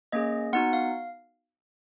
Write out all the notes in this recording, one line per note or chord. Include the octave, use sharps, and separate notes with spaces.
A#3 C#4 G#4 D#5
B3 D#4 F#4 F#5
F5